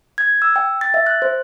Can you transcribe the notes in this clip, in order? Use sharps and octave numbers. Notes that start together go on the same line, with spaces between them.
G#6
E6
G5
A6
E5
F#6
C5